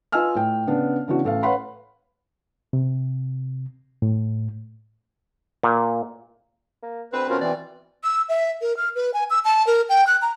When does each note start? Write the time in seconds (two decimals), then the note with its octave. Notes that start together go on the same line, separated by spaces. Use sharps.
0.12 F4 B4 D#5 G#5 E6 F6
0.35 A2 G5
0.67 C#3 B3 D4
1.08 C#3 E3 B3 D4 E4 F#4
1.24 A1 A4 F5
1.42 B4 C#5 F5 F#5 B5 C6
2.73 C3
4.02 A2
5.63 A#2
6.83 A#3
7.13 D2 C4 B4
7.30 B2 C#4 F4 A#4
7.41 E3 C4 D5
8.04 E6
8.29 E5
8.62 A#4
8.77 F6
8.96 B4
9.14 G#5
9.30 E6
9.45 A5
9.67 A#4
9.89 G5
10.07 F#6
10.22 A#5